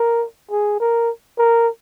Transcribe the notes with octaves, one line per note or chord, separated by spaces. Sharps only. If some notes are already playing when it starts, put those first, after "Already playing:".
Already playing: A#4
G#4
A#4
A#4